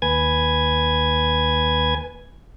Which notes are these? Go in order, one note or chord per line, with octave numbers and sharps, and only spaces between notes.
D#2 B4 G#5 G#6